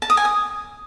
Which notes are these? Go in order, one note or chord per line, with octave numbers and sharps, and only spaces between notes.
A5
D#6
G#5
D#6